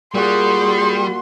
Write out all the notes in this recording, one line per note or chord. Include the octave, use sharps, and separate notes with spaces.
A#2 G3 F#4 G#4 C6